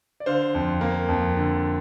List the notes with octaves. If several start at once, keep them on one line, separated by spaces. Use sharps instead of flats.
D5
D3 C5 F5
F2
A#3
F2
D3